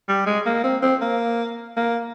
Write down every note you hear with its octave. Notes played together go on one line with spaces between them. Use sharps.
G3
G#3
A#3
C4
C4
A#3
A#3